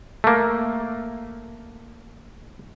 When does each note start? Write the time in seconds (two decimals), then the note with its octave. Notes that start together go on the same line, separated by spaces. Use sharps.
0.24 A3 A#3